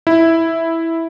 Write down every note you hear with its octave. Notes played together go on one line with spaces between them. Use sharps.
E4